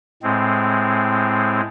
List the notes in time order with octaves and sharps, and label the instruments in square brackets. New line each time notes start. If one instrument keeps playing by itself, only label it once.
[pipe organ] A2 G#3 C4